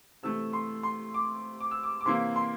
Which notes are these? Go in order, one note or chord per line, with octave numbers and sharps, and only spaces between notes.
C3 E3 A3 E6
C6
C6
D6
D6
E6
D6
D6
C3 E3 A#3 C6
C6